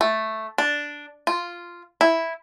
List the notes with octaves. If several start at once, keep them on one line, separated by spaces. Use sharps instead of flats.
A3
D4
F4
E4